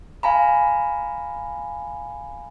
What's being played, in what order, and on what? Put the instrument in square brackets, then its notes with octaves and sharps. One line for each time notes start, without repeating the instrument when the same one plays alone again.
[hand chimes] F5 G#5 A#5 B5